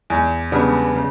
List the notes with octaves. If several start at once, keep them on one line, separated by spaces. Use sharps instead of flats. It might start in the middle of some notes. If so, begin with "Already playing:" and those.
E2
C#3 G3 B3 D4
C#3